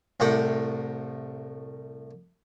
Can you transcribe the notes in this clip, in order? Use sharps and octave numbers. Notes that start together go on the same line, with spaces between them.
C2 A2 G4 F#5